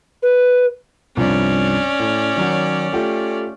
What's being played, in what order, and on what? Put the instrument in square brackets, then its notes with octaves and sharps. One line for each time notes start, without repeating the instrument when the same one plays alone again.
[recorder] B4
[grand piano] C2 G2 F3 [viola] C#4 D5
[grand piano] A2
D#3 F#3 F#4
A3 F4 G4